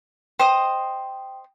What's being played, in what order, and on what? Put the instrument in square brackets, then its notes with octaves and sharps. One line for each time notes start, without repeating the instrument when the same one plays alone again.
[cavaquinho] C5 D#5 D#6 [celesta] G5